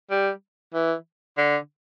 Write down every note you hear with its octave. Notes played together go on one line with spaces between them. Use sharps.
G3
E3
D3